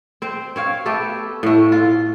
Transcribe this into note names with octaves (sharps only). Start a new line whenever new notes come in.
C4 C5
C4 C#5 F5
A3 B3 G4 A4
A2 A3
F4